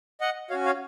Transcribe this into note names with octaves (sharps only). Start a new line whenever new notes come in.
D#5 F#5
C#4 F#4 C#5 F5
C#5 F5